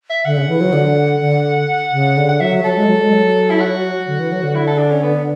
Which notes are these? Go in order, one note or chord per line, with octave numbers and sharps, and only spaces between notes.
E5
D3 F#5
C#3
E3
F#3
D3
D3
C#3
D3
F#5
F#3 E5
F#3 A4
G#3
F#3
G#3
F#3
E4
F#4
D3
E3
F#3
D3
E4
A4
D4
C#4
B3